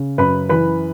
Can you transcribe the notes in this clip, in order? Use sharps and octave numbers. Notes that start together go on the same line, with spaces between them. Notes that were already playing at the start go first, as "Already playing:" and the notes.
Already playing: C#3
F#2 B4 B5
E3 B4 B5